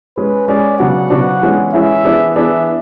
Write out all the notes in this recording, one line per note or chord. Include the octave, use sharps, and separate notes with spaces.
G#3 C#4 G#4 B4
G#3 C#4 G#4 D5
C#3 F#3 B3 D4 F#4 F#5
C#3 F#3 B3 D4 F#4
E3 G#3 C#4 E4 G#4
E3 G#3 C#4 E4 G#4 E5
E3 B3 D4 G#4
E3 B3 D4 G#4 E5